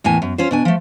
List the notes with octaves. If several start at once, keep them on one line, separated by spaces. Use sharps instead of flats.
E2 A2 A#3 G#5
F#2
C#4 F4 C5
B2 D4 G#5
F3 A3